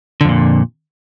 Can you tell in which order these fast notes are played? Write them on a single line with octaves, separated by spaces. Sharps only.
D3 F2 A#2